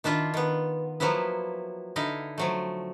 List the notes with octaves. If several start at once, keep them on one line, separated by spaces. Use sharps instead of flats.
D#3 D4 E4 F4
D#3 B3
F3 F#3 A#3 B3 E4
D3 D#4 E4 D#5 F5
F3 F#3 A3